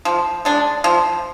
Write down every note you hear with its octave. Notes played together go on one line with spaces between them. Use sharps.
F3
G#3 D4
F3